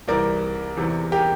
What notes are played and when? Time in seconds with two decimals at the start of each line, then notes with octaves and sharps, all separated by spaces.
0.08 C2 C3 E3 A#4 D5
0.77 E2 C3 E3
1.12 G4 A#4